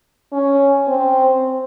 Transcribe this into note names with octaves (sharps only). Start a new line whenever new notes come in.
C#4
C4